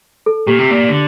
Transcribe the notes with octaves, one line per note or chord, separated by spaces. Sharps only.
A4
A#2 G4
C3
A#2
D3